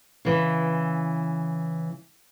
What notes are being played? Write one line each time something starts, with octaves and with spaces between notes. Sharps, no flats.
C#3 E3